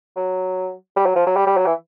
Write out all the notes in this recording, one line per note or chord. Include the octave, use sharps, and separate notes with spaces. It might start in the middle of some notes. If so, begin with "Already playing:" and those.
F#3
G3
F#3
F3
F#3
G3
G3
F#3
E3